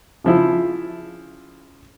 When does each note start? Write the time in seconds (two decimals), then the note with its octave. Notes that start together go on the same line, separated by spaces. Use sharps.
0.24 C#3 F3 E4